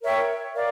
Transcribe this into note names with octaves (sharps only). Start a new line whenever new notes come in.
A#4 C#5 E5 G5
A#4 D5 F5